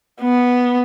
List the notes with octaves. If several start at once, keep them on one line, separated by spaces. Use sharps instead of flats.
B3